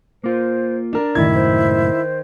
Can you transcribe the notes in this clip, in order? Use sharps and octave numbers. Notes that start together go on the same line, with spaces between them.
A#3 F4 C5
D4 A#4 D5
C#2 F#2 A2 D#3 E4 G#6
C5